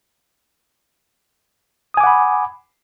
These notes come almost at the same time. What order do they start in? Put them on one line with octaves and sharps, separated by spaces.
D#6 G#5 D6 F#5 B5